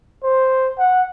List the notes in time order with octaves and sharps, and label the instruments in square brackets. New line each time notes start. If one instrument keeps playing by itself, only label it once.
[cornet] C5
F#5